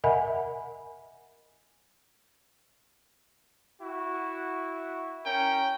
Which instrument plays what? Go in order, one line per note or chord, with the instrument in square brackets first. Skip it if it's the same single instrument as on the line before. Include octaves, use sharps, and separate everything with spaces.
[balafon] A#4 D#5 E5 F#5 G#5 B5
[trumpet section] E4 F#4
[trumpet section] C#4 A#4 [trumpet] G5